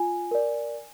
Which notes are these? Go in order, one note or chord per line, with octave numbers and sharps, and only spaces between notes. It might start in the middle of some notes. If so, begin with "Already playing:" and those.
Already playing: F4 G#5
A#4 D5